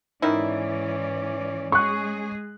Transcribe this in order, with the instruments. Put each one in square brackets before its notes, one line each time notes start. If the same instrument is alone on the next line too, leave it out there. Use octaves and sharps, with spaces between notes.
[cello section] G#2 E3 D5 [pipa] D#3 D#4 E4 [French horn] C#4
[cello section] G#3 G#4 [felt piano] C#6 F#6